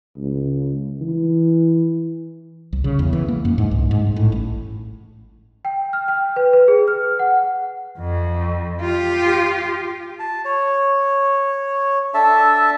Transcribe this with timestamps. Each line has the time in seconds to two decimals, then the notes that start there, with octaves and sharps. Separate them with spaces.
0.17 C#2
1.01 E3
2.73 C2
2.84 C#3
2.99 E2
3.13 E3
3.28 A#3
3.45 F#2
3.58 G#2
3.71 C2
3.91 G#2
4.16 A2
4.32 A1
5.65 G5
5.93 F6
6.08 G5
6.36 B4
6.53 B4
6.68 G#4
6.88 F6
7.19 F#5
7.99 F2
8.81 F4 G4
10.19 A5
10.45 C#5
12.14 D4 A4 E5 A5